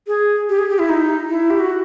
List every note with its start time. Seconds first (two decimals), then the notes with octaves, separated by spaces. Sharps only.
0.07 G#4
0.49 G4
0.59 G#4
0.69 G4
0.79 E4
0.89 D#4
1.29 E4
1.50 G4
1.60 F#4